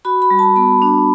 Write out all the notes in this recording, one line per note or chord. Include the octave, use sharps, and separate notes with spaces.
F#4 B5
B5
G3
A5
B3 B5
D4